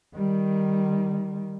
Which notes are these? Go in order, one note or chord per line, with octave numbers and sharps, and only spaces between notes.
D#3 G3